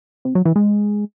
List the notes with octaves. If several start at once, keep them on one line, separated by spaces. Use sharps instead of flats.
C3
F#3
E3
G#3